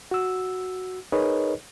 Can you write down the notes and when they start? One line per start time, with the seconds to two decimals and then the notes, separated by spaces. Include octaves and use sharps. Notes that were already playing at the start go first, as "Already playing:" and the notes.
0.11 F#4 E6
1.12 D#4 G#4 A#4 B4 C#5 D#5